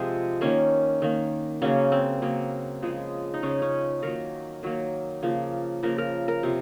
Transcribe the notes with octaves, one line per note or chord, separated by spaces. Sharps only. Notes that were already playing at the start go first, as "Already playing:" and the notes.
Already playing: C3 F3 G#3 C4
D#3 A#3 C#4
D#3 A#3
C#3 F#3 A#3 C#4
C4
C#3 F#3 A#3
C#3 F3 G#3
D#4
C#3 F3 G#3 C#4
C#4
D#3 F#3 A#3 A#4
D#3 F#3 A#3
C#3 F3 A#3
C#3 F3 A#3 A#4
A#4
A#4
C3 F3